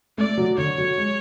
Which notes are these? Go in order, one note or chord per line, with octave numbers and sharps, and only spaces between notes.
A3 D5
F#3
D3 C#5
F#3
G#3